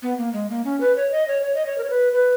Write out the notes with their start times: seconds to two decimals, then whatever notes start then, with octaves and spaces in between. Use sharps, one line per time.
0.03 B3
0.18 A#3
0.33 G#3
0.50 A#3
0.65 C#4
0.81 B4
0.96 C#5
1.12 D#5
1.28 C#5
1.42 C#5
1.55 D#5
1.66 C#5
1.78 A#4
1.84 C#5
1.90 B4
2.13 B4